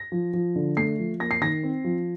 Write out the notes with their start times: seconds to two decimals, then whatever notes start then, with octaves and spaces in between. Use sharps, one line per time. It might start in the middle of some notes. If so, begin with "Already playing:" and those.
Already playing: A#6
0.12 F3
0.33 F3
0.56 D3
0.77 A3 C7
0.98 F3
1.20 A#3 A#6
1.31 C7
1.41 D#3 A#6
1.63 C4
1.84 F3